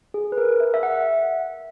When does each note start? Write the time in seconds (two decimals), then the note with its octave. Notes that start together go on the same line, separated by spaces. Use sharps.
0.14 G#4
0.32 B4
0.38 A#4
0.60 E5
0.74 E5
0.83 F#5